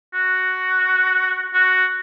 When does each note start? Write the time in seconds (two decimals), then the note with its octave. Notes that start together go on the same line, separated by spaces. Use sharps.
0.14 F#4
1.54 F#4